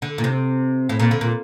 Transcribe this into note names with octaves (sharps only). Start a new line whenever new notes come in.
D3
A#2
C3
A2
A#2
D3
A#2